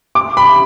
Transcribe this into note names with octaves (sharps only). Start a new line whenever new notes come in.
D6
B5